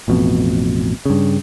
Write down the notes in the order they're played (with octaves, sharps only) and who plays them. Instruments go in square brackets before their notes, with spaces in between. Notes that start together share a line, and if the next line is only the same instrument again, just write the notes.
[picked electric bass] A1 F2 B2
G2 C#3